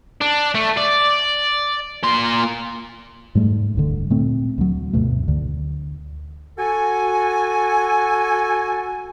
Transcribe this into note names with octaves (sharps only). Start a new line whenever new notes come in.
D4
A3
D5
A#2 C6
G#2 G3 A3
D1 G2 D3
A#2 A3 C4
D2 F#3
D2 G2 B2 A3
D2 D3
F#4 A4 G#5